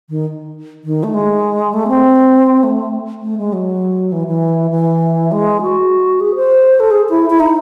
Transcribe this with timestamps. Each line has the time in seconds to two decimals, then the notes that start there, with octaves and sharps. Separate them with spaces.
0.09 D#3
0.84 D#3
1.03 A3
1.14 G#3
1.74 A3
1.88 C4
2.63 A3
3.22 A3
3.38 G#3
3.53 F#3
4.12 E3
4.27 E3
4.71 E3
5.32 G#3
5.62 F#4
6.20 G#4
6.35 C5
6.80 A4
6.91 G#4
7.10 E4
7.30 E4
7.40 D#4